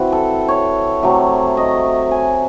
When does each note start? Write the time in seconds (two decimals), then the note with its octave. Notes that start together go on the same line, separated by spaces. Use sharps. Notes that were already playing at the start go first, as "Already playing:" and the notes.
Already playing: E3 C4 E4 F#4
0.12 A4
0.48 C#5
1.03 C3 F#3 A3
1.57 D#5
1.85 E5
2.11 G#5